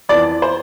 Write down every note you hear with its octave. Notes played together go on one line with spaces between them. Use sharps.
F2 E3 B3 D5
C5